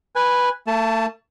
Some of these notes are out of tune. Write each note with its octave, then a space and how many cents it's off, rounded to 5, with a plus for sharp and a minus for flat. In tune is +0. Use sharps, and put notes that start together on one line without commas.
B4 -5 G#5 -10
A3 +40 A5 +0